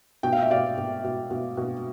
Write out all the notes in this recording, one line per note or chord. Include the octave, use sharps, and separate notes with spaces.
B2 G5
F5
E5
B2 D5 F5
B2
B2
B2
B2